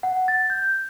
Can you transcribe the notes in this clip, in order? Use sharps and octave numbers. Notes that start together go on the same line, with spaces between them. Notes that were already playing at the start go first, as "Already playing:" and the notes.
F#5
A6
G6